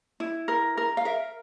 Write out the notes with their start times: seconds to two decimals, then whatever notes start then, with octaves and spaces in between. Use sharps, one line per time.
0.20 E4
0.48 A#4
0.77 A#4
0.97 F5
1.05 A#4 E5